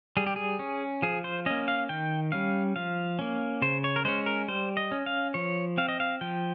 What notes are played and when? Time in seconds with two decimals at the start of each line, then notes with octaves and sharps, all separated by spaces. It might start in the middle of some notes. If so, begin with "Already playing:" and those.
0.17 G3 G#4
0.26 G4
0.36 G#4
0.59 C#4
1.02 F3 G#4
1.24 C5
1.46 A#3 C#4 D#5
1.68 F5
1.89 D#3 G5
2.32 G3 C#4 F5
2.76 F3 F5
3.19 A#3 C#4
3.62 C#3 C5
3.84 C#5
3.96 A#4
4.05 G#3 C#4 C5
4.26 A#4
4.48 G3 C5
4.77 D#5
4.91 C#4
5.06 F5
5.34 F3 C#5
5.78 C4 F5
5.88 D#5
6.00 F5
6.21 F3 G5